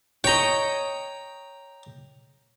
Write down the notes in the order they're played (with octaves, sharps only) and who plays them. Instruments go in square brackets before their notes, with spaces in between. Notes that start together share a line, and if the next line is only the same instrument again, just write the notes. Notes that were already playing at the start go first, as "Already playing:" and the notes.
[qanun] C#5 D#5 [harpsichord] G5 A#5